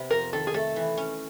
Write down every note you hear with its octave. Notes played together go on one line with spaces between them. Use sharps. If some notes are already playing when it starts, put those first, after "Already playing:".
Already playing: C3 B3
F2 A#4
D#3 A4
G#4
A3 A4
E3
C#4